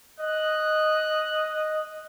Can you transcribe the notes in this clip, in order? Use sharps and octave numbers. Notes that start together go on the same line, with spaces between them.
D#5 F#6